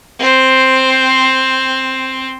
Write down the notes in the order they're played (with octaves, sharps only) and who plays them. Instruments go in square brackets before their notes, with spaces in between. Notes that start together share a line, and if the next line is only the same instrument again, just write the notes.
[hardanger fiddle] C4 C5